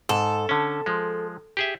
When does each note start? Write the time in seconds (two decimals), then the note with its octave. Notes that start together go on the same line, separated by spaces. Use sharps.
0.09 G#2 A4
0.49 D3 C#4
0.86 F3 G#3
1.57 G4 G#4 E5